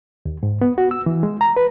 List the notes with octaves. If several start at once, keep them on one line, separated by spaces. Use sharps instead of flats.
D#2
G#2
B3
F#4
E6
E3
G#3
A#5
B4